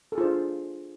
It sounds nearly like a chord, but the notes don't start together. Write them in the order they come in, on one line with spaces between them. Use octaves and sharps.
A4 G#4 F4 C5 D4